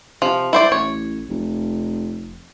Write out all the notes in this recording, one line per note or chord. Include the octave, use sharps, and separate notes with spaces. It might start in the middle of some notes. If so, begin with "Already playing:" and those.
C3 F3
E4 C5 D5
A1 C#5
F1